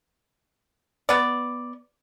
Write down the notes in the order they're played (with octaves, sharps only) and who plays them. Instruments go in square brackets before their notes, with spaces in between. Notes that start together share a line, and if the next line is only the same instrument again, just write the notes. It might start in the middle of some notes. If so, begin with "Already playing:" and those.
[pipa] B3 D5